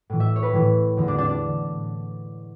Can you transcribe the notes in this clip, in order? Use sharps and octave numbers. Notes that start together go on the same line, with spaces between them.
A2 E3
E5
C#5
B4
A2 E3
E2 D3
D4
D4
D4